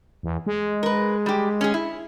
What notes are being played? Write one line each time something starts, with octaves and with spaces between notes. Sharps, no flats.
E2
G#3
A#4 B4
G3 G4
C#4 G#4
E4